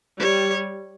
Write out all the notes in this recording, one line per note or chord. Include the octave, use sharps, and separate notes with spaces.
G3 C#5